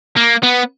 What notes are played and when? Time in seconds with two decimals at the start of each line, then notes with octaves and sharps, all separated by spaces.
0.17 A#3
0.43 B3